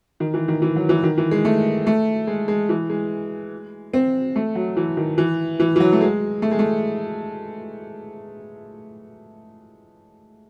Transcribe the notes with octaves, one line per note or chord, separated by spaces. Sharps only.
D#3
E3
D#3
E3
F#3
E3
D#3
E3
G#3
A3
A3
G#3
G#3
E3
G#3
C4
A3
F#3
E3
D#3
E3
E3
E3
F#3
A3
G#3
A3
G#3
A3